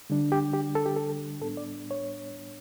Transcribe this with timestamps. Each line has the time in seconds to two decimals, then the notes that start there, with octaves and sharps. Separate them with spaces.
0.10 D3 G3 D4
0.32 G4
0.54 G4
0.75 A4
0.86 G4
0.97 A4
1.41 A2 G3 B3 D4 A4
1.57 D5
1.91 C#5